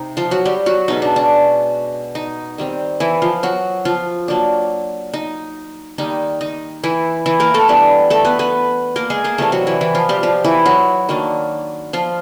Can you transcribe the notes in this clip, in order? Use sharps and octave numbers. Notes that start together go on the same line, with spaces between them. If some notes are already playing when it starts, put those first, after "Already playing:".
Already playing: C3 D#4
F3 F4
F#3 F#4
G3 G4
F#3 F#4
B2 G#3 C#4 D#4
D4
D4
D#4
D#3 G3 C4
E3 E4
F3 F4
F#3 F#4
F3 F4
F#3 A#3 D4
D#4
D#3 G3 A#3 D#4
D#4
E3 E4
E3 E4
A#3 A#4
A3 A4
E3 G3 B3 D4
A3 A4
B3 B4
B3 B4
A#3 A#4
G#3 G#4
A#3 A#4
C3 E3 G3 A3 A#3 A4
F#3 F#4
E3 E4
E3 E4
F3 F4
G3 G4
F3 F4
E3 E4
F#3 F#4
D#3 F#3 A#3 D4
F3 F4